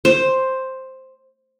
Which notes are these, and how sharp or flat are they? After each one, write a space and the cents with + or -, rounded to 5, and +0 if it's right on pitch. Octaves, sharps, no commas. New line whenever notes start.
C5 +5